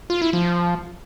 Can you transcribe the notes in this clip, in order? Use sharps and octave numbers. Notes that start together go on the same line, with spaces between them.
F4
E4
F3